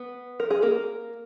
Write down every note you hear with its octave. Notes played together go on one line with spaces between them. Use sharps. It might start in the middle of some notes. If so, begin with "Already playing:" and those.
Already playing: B3
A#4
G#4
A#3 A#4